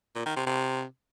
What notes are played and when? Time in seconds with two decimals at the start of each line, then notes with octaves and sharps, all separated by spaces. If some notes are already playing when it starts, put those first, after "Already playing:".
0.15 A#2
0.26 D#3
0.36 C3
0.46 C3